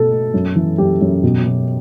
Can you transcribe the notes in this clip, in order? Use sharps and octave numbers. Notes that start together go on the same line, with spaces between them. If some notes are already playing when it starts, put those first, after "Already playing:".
Already playing: B2 A3 A4
A3
F#2
E3
F#2 G4
F#2
B2
B2